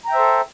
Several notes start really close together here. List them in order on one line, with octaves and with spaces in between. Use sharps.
A#5 G5 E5 C5 A4